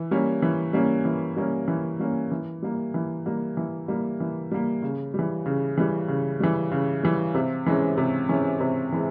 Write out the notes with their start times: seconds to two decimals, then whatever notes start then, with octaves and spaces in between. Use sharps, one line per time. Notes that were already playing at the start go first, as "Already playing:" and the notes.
Already playing: E3
0.11 G3 A#3 C#4
0.42 E3
0.73 G3 A#3 C#4
1.05 E3
1.37 G3 A#3 C#4
1.68 E3
1.99 G3 A#3 C#4
2.31 E3
2.62 G3 A#3
2.94 E3
3.26 G3 A#3
3.57 E3
3.88 G3 A#3
4.20 E3
4.51 G3 A#3
4.83 C#3
5.14 E3 G3
5.46 C#3
5.78 E3 G3
6.08 C#3
6.40 E3 G3
6.72 C#3
7.03 E3 G3
7.35 C3
7.66 E3 G#3 C#4
7.97 C3
8.29 E3 G#3 C#4
8.60 C3
8.92 E3 G#3